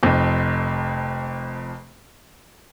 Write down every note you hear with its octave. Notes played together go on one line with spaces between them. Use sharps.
F1 F2